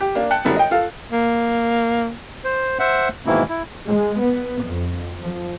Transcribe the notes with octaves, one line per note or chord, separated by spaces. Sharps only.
G4
A#3 D4
G5 A5 F#6 C#7
F#2 D3 G3 B3 E4
D#5 G5
F4 A4 F5
A#3
C5
C5 E5 F#5
G#2 B2 D#3 E3 A#3 E4
E4
G#3
B3
F2
F3